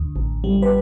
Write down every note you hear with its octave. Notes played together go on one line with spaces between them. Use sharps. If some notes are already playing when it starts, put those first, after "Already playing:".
Already playing: D2
A1
G3
B4